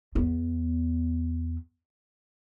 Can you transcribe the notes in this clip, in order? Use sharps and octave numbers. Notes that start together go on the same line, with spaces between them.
E2 B3